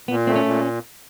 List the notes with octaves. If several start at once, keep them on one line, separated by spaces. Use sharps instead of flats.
A#2 B3
A3 C4
C#4
A#2